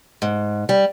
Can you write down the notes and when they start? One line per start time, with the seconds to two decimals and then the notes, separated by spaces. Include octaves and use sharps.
0.22 G#2
0.69 G3